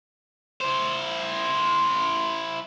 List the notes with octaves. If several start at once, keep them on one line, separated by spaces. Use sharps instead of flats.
E4 C5